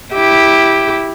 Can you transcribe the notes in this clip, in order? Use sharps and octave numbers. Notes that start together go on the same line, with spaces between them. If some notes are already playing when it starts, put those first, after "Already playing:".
E4 G4